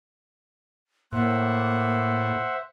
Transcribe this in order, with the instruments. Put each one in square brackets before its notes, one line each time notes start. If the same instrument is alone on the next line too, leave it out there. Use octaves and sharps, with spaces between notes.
[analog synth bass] A2 [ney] A#3 [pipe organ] C5 E5 F#5